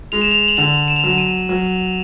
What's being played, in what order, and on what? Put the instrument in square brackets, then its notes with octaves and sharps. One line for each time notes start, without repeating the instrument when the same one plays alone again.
[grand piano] G#3 [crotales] F7
[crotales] E7
F7
F#7
[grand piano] D3 [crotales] F7
[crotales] E7
F7
[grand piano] F#3 [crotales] E7
[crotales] D#7
[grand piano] F#3